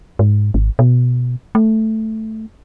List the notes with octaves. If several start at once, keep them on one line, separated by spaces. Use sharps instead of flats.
G#2
G#1
B2
A3